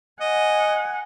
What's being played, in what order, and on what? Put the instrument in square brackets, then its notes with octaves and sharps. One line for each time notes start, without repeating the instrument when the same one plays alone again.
[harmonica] D#5 [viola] F#5 G#5